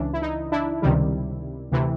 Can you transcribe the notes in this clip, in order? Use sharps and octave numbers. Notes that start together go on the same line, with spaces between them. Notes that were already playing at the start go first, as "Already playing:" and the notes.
Already playing: C#2 C#3 E3 D4
E4
D#4
D4 E4
C#2 C3 D#3 G3
D2 C3 E3